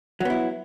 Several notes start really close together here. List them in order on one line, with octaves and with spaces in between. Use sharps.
F#3 B3 E4